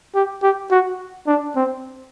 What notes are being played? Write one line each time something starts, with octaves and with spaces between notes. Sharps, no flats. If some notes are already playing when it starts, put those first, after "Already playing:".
G4
G4
F#4
D4
C4